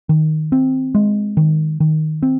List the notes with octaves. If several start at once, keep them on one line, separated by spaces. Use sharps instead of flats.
D#3
C4
G#3
D#3
D#3
C4